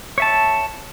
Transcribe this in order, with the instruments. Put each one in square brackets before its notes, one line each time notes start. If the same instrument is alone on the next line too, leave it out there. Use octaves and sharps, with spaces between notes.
[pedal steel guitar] C#5 E5 A5